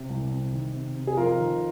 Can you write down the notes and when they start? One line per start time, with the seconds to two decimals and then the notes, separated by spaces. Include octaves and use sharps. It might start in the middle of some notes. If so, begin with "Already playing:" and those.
Already playing: C3
0.10 C2
0.31 C3
0.53 D#3
0.74 C3
0.95 C3
1.07 G#4
1.17 F2 F4 A#4
1.38 D#3